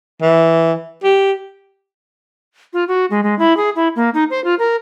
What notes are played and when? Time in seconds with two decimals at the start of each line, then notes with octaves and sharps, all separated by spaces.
0.22 E3
1.04 G4
2.73 F4
2.88 F#4
3.10 G#3
3.23 G#3
3.39 E4
3.57 G#4
3.76 E4
3.96 A#3
4.14 D#4
4.30 C5
4.44 F4
4.59 A#4